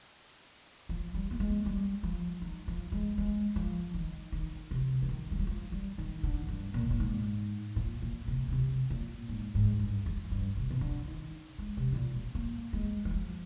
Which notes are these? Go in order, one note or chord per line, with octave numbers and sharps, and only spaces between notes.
F3
G3
A#3
G#3
G3
F3
D#3
F3
G#3
G#3
F3
D#3
D#3
C3
D3
D#3
G#3
G3
F3
G3
D#3
D3
G2
A#2
C3
A#2
G#2
A#2
A#2
C3
D3
C3
A#2
G#2
G#2
G2
F2
G2
C3
C3
D3
D#3
G#3
C3
G#2
A#2
D3
A#3
G#3
G3
F3